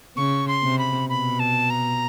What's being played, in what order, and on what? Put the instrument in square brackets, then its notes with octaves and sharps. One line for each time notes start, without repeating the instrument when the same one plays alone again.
[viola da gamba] C#3 [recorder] C#6
[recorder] C6
[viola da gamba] C3
[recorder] B5
[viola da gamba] B2 [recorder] B5
[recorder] A5
A#5